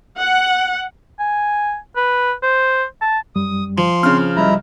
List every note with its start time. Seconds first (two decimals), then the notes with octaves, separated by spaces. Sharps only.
0.19 F#5
1.20 G#5
1.96 B4
2.43 C5
3.01 A5
3.36 F#2 G3 D#6
3.78 F3 C6
4.03 C#3 C4 F6
4.36 C2 G3 E4 D#5 A#5